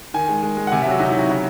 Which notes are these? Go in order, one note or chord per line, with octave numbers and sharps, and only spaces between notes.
D#3 G#5
G#3
G#3
G#3
F#5
C3 G#5
E5
F#3
F#4
C3 D#4
E4
F#3 F#4
C#3